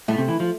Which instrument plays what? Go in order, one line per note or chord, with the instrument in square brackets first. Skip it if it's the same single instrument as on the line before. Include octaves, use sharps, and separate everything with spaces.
[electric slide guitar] A2 [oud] A3
[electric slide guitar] C3
E3
F3